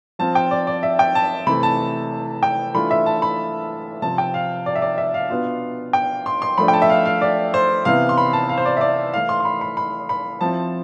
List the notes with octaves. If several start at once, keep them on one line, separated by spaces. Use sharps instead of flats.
F3 C4 F4 A5
G5
D5
D5
E5
G5
A5
C3 E3 A3 B5
A5
G5
E3 A3 D4 F4 B5
E5
A5
B5
C3 F3 C4 A5
G5
F5
D5
E5
D5
E5
F5
B2 B3 D4 F4
G5
C6
C6
F3 A3 D4 B5
G5
A5
E5
F5
F5
D5
C5
C3 E3 B3 E4 F5
C6
B5
A5
F5
C5
D5
E5
D5
E3 A3 E4 F5
C6
C6
B5
B5
B5
B5
F3 C4 E4 A5